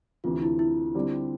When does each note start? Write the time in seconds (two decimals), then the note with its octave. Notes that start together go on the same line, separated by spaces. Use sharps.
0.24 D2 C3 E3 F4
0.42 E4
0.59 E4
0.95 D3 G3 C4